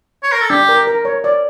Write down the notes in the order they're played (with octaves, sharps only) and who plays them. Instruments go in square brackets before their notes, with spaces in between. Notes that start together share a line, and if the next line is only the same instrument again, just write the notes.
[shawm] C#5
A#4
A4
[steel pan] D4 [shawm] G4
[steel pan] A#4
A#4
C#5
D5